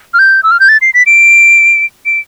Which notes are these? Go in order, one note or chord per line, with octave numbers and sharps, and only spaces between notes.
F6
G6
E6
F6
G6
A6
C7
B6
D7
D7